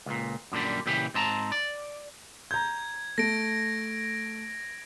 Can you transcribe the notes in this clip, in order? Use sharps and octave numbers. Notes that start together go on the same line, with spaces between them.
C#2 A#2
F#2 A#2 D3 G3
A#2 C#3 E3 G4
G#2 C4 A5 A#5
D5
A#5 G6 G#6
A3 A#6 D7